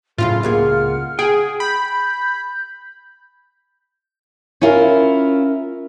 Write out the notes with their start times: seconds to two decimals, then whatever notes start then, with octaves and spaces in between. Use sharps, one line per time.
0.18 A2 C#3 F#3 E4 F4 A4 F5
0.43 C#2 A#3 G#4 F#5 F6
1.19 G#4 G5
1.60 B5 G6
4.61 C#4 E4 F4 A#4